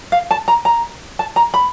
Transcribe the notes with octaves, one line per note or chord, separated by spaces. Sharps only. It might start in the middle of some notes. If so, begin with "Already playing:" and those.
F5
A5
A#5
A#5
A5
A#5
B5